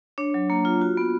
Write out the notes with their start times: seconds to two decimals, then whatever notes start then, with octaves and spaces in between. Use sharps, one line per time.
0.18 D4 C#5
0.34 F#3
0.50 A#3
0.65 F4
0.81 F#4
0.97 B3